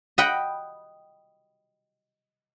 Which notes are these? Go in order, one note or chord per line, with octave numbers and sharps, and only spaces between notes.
D#5 F#5 G5 B5